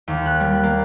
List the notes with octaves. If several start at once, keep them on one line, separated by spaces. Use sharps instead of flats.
D#2
F#6
G3
A#3